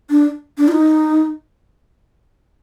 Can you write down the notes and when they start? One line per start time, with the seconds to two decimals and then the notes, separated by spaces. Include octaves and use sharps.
0.10 D4
0.58 D4
0.68 F4
0.72 D#4